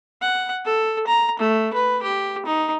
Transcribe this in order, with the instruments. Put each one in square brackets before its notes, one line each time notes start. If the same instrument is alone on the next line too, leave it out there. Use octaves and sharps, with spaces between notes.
[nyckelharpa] F#5
A4
A#5
A3
B4
G4
D#4